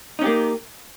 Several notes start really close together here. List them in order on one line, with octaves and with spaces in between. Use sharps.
D#4 C#4 G4 A#3